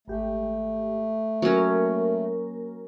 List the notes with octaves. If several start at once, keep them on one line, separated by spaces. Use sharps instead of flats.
G#1 A3 G4
F#3 A#3 C#4 A#4